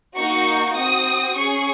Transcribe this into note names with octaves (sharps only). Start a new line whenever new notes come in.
A#3 D#4 F#4 C#6
C4 F#4 D#6
C#4 G#4 C#6